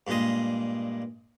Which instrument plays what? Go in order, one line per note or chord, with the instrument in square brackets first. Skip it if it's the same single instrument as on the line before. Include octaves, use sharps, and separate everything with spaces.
[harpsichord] G2 A#2 G#3 D#5